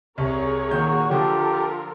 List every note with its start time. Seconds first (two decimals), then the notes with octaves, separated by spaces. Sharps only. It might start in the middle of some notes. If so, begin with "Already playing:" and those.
0.18 C2 G#4 A#4 C#5
0.71 A#2 D#3 F#4 G6
1.10 D3 F3 F4 G4 A4 A#4